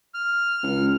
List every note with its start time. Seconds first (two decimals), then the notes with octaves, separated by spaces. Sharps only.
0.14 F6
0.63 C#2